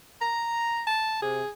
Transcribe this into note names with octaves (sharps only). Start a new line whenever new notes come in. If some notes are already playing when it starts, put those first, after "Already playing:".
A#5
A5
C3 G#4